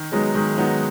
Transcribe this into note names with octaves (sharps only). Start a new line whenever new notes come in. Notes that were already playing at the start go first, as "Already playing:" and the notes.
Already playing: D#3
F#3 G#3 B3 D#4
D#3 G#3
F#3 B3 D#4